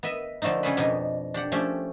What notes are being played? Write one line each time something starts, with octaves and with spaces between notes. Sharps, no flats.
B3 B4 D#5 E5
D3 F3 A3 D4 D#4
C#3 G3 C#4 G#4 A4 B4
F2 B2 B3 D4 D#4
D4 G4 F#5
F3 A3 C#4 G4